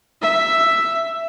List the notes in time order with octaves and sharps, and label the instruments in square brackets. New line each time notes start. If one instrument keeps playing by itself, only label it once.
[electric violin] E5